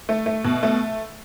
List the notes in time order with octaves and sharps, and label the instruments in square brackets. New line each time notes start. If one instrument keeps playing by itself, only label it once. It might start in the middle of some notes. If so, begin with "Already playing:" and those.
[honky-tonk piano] A3
A3
B2
A3